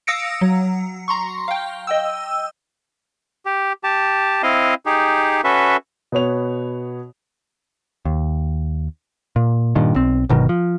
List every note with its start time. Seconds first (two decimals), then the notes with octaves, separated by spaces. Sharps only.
0.07 F5 D#6 E6 A#6 C#7 D7
0.41 F#3
1.08 A#5 C6 C#6
1.48 F5 G5
1.87 D#5 G5 E6
3.46 G4
3.84 G4 A5
4.43 C4 E4 D#5 F5
4.86 D#4 G4 G#4
5.44 C#4 F#4 A4 B4 E5
6.12 B2 B3 C#5 F7
8.05 D#2
9.36 A#2
9.75 G2 A#2 D#3
9.95 B1 C4
10.29 G1 B2 D#3 F#3
10.49 F3